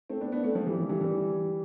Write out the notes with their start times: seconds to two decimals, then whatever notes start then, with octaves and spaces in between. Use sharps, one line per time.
0.10 A3 C4
0.21 B3 D4
0.32 B3 D4
0.44 A3 C4
0.55 F3
0.66 E3 G3
0.78 E3 G3
0.89 E3 G3
1.01 E3 G3